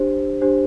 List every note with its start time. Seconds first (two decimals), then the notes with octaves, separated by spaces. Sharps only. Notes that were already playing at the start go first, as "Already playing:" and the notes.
Already playing: D4 G4 C5
0.41 D4 G4 C5